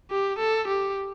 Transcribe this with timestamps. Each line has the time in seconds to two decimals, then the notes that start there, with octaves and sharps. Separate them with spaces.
0.11 G4
0.39 A4
0.68 G4